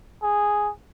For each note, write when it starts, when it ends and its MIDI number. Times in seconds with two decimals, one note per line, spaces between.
0.23 0.71 68